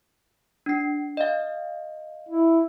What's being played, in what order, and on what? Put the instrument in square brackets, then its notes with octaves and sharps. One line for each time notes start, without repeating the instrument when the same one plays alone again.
[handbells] D4 C7
D#5 F5
[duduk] E4